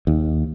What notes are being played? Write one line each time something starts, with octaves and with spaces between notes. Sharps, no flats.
D#2